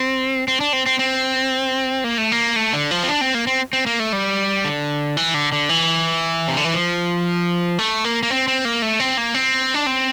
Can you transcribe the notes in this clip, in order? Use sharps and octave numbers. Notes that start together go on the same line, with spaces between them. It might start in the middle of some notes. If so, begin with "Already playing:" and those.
Already playing: C4
C4
D4
C4
C4
C4
A#3
A3
A#3
A3
D3
F3
C4
D4
C4
A#3
C4
C4
A#3
A3
G3
D3
E3
D3
D3
E3
C3
D3
E3
F3
A3
A#3
A#3
C4
C4
A#3
A3
C4
A#3
C4
D4
C4